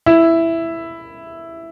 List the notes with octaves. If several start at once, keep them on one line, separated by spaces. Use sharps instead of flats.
E4